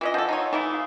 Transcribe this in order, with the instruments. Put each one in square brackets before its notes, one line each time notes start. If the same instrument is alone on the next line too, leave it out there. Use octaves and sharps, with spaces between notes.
[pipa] E3 C#4 D#5 [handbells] F4
[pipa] F3 A4 [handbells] D#5 F#5 G#5
[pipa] D#4 F4 C#5
[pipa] E3 A3 E4 [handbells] D#4 D#6
[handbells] F5 D#6